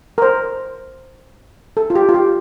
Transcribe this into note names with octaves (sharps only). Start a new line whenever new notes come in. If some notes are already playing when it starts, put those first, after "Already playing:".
A#4
C5
A4
F4
G4
F4
G4